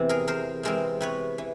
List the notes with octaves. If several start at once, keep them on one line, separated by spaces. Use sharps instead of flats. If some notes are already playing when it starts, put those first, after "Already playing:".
Already playing: E2 C3 E3 C4
G#4 A#4
E2 A#4 C5
C3 E3 G#3 C4 A#4 C5
C3 B4 C#5
E3